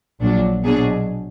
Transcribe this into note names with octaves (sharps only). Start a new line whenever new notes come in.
A#1 A#2 F#3 D4
B2 F#3 D4 G#4